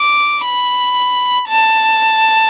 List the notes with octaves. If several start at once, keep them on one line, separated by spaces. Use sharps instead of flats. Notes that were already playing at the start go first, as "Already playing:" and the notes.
Already playing: D6
B5
A5